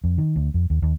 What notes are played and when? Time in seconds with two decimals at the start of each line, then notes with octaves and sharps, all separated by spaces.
0.04 F2
0.18 D#3
0.36 D2
0.54 F2
0.70 D#2
0.82 D#2